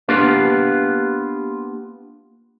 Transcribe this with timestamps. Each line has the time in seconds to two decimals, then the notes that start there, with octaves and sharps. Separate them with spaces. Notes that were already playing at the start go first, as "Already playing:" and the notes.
0.08 A#3 B3 D4 F4 G4 B4